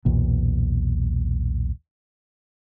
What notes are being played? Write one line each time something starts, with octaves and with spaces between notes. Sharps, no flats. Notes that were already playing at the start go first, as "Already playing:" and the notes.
B1 E2 A#2